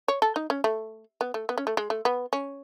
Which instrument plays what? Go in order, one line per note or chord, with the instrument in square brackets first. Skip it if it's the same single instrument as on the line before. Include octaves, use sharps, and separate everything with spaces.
[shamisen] C#5
A4
D#4
C#4
A3
B3
A3
B3
C#4
A3
G#3
A3
B3
C#4